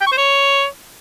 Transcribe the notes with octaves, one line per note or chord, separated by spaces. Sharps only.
G5
C#6
C5
C#5